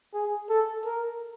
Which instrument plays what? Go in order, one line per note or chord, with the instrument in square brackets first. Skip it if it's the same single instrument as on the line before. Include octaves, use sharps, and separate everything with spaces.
[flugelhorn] G#4
A4
A#4